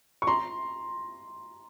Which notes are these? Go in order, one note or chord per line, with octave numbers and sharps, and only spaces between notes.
C#6
A#5 C6